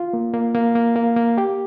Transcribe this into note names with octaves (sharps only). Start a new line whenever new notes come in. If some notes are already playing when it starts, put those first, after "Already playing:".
Already playing: F4
A#3
A#3
A#3
A#3
A#3
A#3
G4